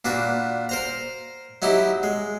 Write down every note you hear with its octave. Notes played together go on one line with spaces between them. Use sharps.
A#2 D4 F#4 B4
A#4 C5 A#5
F#3 D#4 E4 G4
G#3